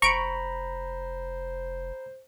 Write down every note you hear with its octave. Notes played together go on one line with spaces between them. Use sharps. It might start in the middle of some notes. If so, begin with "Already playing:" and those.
F1 C5 A#5 B5 C#6 D7